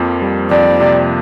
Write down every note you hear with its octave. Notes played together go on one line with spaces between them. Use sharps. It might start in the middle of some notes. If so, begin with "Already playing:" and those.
Already playing: F2 F3 A#3
G3
F2 D5
C3